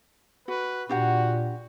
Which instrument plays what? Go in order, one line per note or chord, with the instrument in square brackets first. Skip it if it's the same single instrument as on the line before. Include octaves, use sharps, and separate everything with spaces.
[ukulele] F#4 [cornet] B4
[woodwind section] A#2 [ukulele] D4 G4 F#5 [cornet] F#4